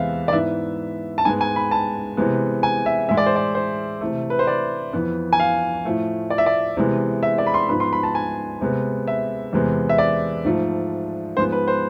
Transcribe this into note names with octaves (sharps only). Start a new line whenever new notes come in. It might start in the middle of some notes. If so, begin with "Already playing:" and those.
Already playing: E2 C3 G#3 B3 E5 F5
D5
G#2 E3 B3 E5
A5
G#2 G#3 B3 G#5
G#5
B5
A5
C3 E3 G#3 B3
G#5
E5
A2 E3 G#3 E5
D5
C5
D5
C5
C3 E3 A3
B4
C5
D5
F2 E3 B3
G#5
F5
A2 F3 A3
D5
E5
D5
C3 E3 G#3 B3
E5
D5
B5
C6
G#2 F3 B3 B5
C6
B5
A5
G#5
C3 G#3 B3
E5
E2 C3 G#3 B3
E5
D5
G#2 F3 A3
G#2 F3 G#3 B3 C5
B4
C5